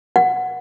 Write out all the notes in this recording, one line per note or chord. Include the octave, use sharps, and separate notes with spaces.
F#5